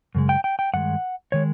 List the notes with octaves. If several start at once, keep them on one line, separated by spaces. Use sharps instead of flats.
F#2 C#3 G#3
G5
G5
G5
G2 D#3 G#3 F#5
D#3 G#3 C#5